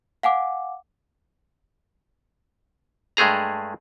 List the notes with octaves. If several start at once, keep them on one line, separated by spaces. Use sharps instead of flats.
F5 F#5 G#5 D6
G2 G#3 A3 G#4 A#5